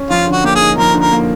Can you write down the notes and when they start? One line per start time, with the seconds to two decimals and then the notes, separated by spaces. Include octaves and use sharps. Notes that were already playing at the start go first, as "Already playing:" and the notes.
Already playing: C#4
0.10 F3 F4
0.27 D3
0.32 F#4
0.44 A#3 G4
0.55 G#4
0.61 D#4
0.77 F3 A#4
0.94 D3
1.00 A#4
1.12 A#3